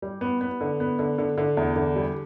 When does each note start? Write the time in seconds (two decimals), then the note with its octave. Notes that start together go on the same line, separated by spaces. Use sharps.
0.02 G3
0.21 B3
0.41 B3
0.61 D3
0.80 B3
0.99 D3
1.18 D3
1.38 D3
1.57 E2
1.76 D3
1.96 G3